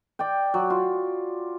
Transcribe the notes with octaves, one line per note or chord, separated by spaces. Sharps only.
D5 G5
F#3
F4